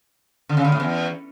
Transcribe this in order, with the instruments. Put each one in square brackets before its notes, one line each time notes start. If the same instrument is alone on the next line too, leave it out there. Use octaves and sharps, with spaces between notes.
[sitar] D3
C#3
D3
A2
E2